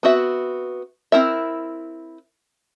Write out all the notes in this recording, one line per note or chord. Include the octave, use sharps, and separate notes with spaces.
B3 C4 F#4 E5
C4 E4 A#4 E5